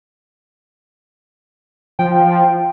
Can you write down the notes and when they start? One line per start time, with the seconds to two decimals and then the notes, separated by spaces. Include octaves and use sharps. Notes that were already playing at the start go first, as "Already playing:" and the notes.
1.99 F3 G5